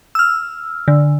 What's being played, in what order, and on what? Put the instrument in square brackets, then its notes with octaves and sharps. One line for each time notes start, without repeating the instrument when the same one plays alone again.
[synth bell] E6 F6
D3